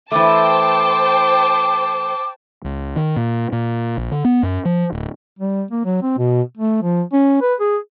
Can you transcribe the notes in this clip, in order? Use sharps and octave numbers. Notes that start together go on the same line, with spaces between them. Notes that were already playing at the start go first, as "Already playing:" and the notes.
E3 A3 C5 G5 A5 D6
C#2
D#3
A#2
A#2
A#1
D3
B3
F#2
F3
D1
G3
A#3
F#3
C4
B2
A3
F3
C#4
B4
G#4